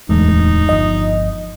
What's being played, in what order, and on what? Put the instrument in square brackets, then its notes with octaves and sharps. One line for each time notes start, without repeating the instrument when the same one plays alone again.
[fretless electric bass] D1 G#3 A3 [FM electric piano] E2 [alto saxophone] D#4
[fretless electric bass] G1 F3 [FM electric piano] D#5